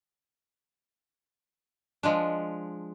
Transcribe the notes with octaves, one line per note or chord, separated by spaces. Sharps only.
F3 G#3 D4